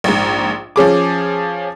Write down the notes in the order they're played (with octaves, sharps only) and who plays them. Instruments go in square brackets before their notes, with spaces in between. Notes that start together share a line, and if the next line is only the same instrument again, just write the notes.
[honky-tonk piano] A#1 G#2
F3 C#4 G#4 D6